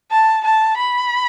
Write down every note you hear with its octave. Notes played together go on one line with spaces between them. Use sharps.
A5
A5
B5